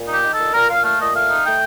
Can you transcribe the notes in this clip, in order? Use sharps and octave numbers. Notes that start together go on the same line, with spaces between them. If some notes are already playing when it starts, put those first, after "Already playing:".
Already playing: A#2
D#4 G4
D#4
A#2 A4
A#2 A#4
A#2 F5
A3 F5
A#2 D#5
A3 F5
D#4
A3 G5